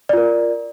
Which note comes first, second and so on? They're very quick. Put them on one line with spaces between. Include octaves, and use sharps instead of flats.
D5 F4 A#4